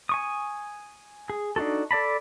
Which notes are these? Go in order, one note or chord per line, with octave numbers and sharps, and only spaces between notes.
G#5 C#6 D#6
G#4
D4 D#4 F#4 A4
A4 D5 A5 B5